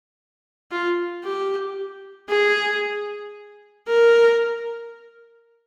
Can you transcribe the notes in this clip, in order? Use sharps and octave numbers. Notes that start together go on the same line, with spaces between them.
F4
G4
G#4
A#4